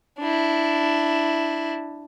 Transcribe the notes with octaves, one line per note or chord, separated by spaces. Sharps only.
D4 E4